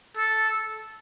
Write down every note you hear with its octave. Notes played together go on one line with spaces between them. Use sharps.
A4